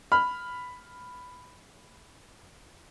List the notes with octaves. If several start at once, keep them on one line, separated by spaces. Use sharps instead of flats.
B5 F6